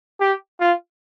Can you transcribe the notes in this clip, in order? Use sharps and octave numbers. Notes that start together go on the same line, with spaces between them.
G4
F4